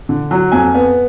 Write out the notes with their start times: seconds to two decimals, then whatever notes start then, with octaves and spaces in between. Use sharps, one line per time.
0.09 D3
0.31 F#3
0.52 F2 G#5
0.74 B3